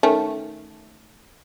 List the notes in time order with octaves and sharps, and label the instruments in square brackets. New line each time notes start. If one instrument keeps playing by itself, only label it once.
[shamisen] D#3 A3 C#4